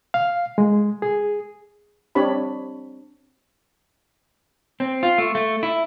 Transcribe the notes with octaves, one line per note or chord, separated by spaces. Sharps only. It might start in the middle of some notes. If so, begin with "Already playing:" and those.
F5
G#3
G#4
C4 D4 G4 C#5 B5
C4
F4
A3
A3
E4